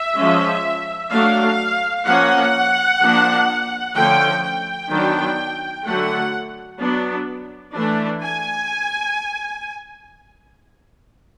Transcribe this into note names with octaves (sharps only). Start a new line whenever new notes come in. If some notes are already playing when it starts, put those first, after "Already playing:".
Already playing: E5
F3 G#3 C#4
F#3 A3 D4 F5
F3 A#3 C#4 F#5
F3 A#3 D4
D3 F3 A3 C#4 G5
G5
D#3 F#3 B3 D4
D3 F#3 A3 F#5
F#3 B3 D4
E3 A3 D4
G#5